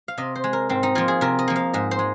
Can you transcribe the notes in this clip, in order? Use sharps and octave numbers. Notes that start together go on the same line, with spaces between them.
F5
C3 D#5
C5
G#3
A#4
G#2 C4
D#4
F3 A#3 F4
G#4
C3 A#4
D#5
F3 A#3
F5
G#2 D#5
C5
G#3